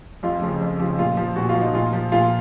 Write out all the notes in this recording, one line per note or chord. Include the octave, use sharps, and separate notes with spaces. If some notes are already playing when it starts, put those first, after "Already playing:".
F2 F4
C#3 F3
F2
C#3 F3
A#2 F4
F3
A#2 F#4
F4
F3
D#4
A#2 F4
F3
A#2 F4